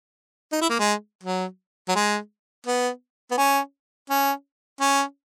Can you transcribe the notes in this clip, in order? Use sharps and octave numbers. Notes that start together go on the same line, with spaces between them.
D#4
E4
A#3
G#3
F#3
F#3
G#3
B3
B3
C#4
C#4
C#4